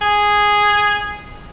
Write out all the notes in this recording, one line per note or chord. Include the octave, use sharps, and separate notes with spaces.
G#4